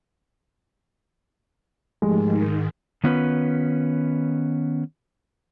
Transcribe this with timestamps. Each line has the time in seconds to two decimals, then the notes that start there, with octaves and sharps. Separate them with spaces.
2.02 G#2 D#3 F3 G#3 A3 G4
3.04 D#3 B3 C#4 F4 B4